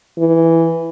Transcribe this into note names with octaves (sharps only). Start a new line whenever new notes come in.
E3